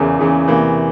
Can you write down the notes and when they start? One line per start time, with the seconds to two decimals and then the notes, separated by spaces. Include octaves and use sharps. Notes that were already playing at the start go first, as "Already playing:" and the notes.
Already playing: E2 C#3 E3 A#4
0.19 E2 C#3 E3
0.48 E2 C3 E3 A#3